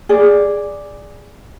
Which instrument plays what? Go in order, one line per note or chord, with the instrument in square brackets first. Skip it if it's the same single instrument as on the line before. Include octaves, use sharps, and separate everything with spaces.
[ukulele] G#4 D5